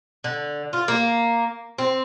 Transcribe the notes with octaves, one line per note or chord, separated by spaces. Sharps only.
D3
F4
A#3
C4